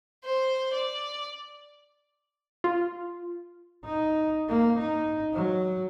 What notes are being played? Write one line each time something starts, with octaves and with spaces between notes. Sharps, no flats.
C5
D5
F4
D#4
A#3
D#4
F#3